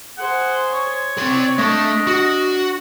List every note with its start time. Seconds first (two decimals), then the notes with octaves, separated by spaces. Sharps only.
0.18 G#4 C5 F#5
0.73 C#5
1.18 C4 D5 C6
1.58 A3 D4 A4 D#5
2.07 F#4